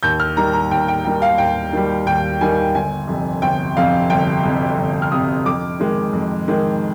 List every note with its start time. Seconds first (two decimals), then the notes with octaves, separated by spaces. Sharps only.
0.03 D#2 G6
0.20 F6
0.37 D#3 G3 A#5
0.53 A#5
0.71 D#2 G5
0.88 G5
1.05 D#3 G3 G5
1.22 F5
1.38 D#2 G5
1.73 D#3 G3
2.07 D#2 G5
2.41 D#3 G3 G#5
2.74 G1 G#5
3.08 F2 C3
3.42 G1 G5
3.77 F2 C3 F5
4.10 G1 G5
4.44 F2 C3
4.78 G1
5.02 F6
5.12 F2 C3 D#6
5.46 F2 D6
5.80 D#3 G#3
6.13 F2
6.48 D#3 G#3